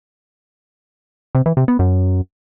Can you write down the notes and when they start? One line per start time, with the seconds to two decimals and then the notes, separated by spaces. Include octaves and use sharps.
1.35 C3
1.46 E3
1.57 C3
1.68 B3
1.79 F#2